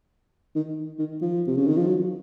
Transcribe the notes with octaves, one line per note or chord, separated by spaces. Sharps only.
D#3
D#3
F3
C3
C#3
D#3
F3
F#3